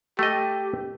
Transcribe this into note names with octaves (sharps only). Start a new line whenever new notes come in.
A3 G4 D#5